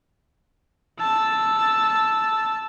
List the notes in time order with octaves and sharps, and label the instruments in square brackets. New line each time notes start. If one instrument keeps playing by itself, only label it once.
[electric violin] A5 E6